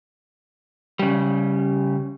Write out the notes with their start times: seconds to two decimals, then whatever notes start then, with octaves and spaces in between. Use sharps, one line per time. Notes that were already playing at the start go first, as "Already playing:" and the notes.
0.99 C#3 G3